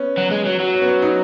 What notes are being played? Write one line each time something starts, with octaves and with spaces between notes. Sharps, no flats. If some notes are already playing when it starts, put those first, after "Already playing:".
Already playing: B3 C#4
F#3
G#3
F#3
F#3
C#4
B3
C#4
D#4